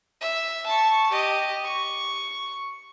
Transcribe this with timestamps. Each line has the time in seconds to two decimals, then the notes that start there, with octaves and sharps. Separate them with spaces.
0.21 E5
0.66 A5 C#6
1.11 G4 D#5
1.64 C#6